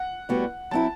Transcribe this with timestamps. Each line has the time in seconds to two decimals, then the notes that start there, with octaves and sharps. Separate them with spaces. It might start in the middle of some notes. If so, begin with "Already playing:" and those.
Already playing: F#5
0.29 A2 G3 B3 F#4
0.71 F#3 C4 E4 A5